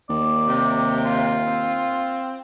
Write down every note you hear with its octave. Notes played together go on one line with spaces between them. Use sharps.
D#2 D5
C3
F4
C4